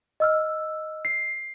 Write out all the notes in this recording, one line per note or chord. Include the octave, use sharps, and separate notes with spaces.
D#5 E6 F6
C7